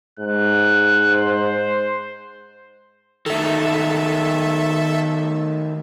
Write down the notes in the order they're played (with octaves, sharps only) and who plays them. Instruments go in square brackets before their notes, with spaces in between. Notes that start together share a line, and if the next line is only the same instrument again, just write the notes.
[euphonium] G#2 [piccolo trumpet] F#6
[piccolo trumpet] C5
[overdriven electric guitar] D#3 A3 [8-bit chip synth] A4 E5